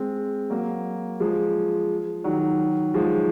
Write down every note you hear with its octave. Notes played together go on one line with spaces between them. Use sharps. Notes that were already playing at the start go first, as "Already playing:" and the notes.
Already playing: G#3 C4
F#3 A#3
F3 G#3
D#3 F#3
F3 G#3